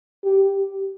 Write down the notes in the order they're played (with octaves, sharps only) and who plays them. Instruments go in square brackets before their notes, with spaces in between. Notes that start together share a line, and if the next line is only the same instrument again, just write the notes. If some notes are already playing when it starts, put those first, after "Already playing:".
[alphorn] G4